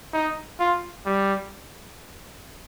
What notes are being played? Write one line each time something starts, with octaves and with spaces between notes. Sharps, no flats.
D#4
F4
G3